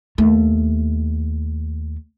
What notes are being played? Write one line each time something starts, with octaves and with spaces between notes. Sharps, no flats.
D#2 A3